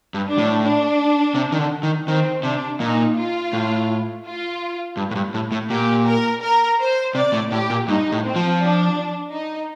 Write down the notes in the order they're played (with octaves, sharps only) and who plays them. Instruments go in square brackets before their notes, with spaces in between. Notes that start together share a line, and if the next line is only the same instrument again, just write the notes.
[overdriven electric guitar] G2
[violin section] D4
[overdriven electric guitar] A2
[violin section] D4
[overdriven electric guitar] C3
D#3
D3
D#3
[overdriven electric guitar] D#3 [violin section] C4
[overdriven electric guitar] C3 [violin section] D4
[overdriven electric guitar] A#2 [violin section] D#4
[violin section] F4
[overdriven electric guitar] A2
[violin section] F4
[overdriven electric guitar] G2
A2
G2
A2
A2
[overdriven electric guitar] A#2 [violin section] G4
[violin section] A#4
A#4
C5
[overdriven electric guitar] C3 [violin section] D5
[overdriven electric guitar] A2
[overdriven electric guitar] A2 [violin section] G4
[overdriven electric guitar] A#2
[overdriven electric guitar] G2 [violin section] D#4
[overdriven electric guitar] A2
[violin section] C4
[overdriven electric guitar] F3
[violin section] D4
D#4